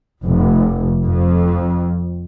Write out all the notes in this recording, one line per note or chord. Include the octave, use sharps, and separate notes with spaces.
F1
F2